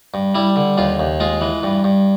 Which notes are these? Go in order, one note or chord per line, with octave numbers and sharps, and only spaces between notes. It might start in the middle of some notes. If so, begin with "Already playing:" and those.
G2
G3 E4
D3
D#2 F4
D#2
G#3 F4
E3
G2
G2